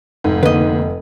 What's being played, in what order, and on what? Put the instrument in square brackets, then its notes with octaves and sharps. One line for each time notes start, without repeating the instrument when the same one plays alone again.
[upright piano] F1 [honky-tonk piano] G#2
[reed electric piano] D3 A#3 [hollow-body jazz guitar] B4 D#5